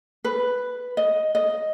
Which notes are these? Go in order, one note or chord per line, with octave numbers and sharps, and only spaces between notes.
B4
D#5
D#5